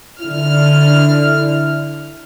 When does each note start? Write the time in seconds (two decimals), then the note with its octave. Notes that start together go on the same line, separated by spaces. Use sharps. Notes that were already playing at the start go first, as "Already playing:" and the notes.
0.21 D3 E4 F6